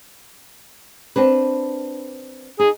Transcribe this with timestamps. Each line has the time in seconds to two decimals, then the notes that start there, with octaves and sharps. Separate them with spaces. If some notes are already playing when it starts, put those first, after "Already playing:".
1.16 C4 D4 B4
2.59 D#4 G#4